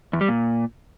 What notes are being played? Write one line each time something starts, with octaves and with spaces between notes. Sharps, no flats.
E2
G3
A#2